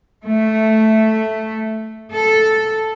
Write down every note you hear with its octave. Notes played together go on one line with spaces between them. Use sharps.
A3
A4